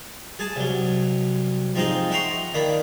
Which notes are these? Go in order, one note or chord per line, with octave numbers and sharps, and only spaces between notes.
G#4 G#5 A5
C2 F#3
F3 C4 D#4 G#4 D#5
E5 F#5 G5 A#5 C6 C#6
D#3 A#3 D4 B5